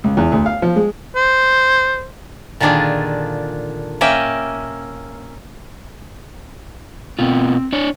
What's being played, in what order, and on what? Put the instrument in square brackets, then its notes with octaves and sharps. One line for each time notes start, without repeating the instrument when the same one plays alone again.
[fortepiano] C#2
E2
D2
F5
F3
G#3
[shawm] C5
[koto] A#2 D3 D#3 D4 F4 G#4
A#3 C#4 D#5 E5 G5
[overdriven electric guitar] B2 F4 [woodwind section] C4
[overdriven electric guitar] D4 C#5